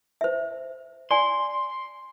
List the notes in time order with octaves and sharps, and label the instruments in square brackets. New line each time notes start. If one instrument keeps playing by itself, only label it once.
[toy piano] C5 E5
[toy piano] D5 G#5 [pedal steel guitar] C6